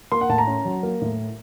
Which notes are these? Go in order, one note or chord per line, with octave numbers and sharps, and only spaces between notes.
A#3 C6
F#5
A2 A5
A#5
C#4
F#3
A#3
A2